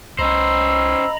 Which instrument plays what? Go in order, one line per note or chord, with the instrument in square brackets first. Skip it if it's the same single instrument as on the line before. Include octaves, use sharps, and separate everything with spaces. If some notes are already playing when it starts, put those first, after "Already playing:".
[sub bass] C2 [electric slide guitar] C#4 C5 [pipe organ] D#5 A#5 B5 [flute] E6